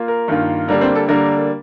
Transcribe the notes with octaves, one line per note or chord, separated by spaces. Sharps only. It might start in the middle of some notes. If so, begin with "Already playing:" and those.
Already playing: A#3 F4
A#4
G2 D#3 A#3 F4
D3 G3 A#3 D4 A#4
C4 C5
A4
D3 G3 A#3 D4 A#4